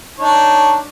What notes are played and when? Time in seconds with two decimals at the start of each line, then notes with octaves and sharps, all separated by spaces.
0.19 D4 D#4 C#5